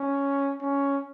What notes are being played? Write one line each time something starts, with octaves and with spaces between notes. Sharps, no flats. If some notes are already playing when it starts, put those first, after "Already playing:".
Already playing: C#4
C#4